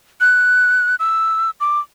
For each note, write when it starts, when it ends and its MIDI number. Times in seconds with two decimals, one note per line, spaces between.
0.21 0.95 90
0.99 1.50 88
1.60 1.80 86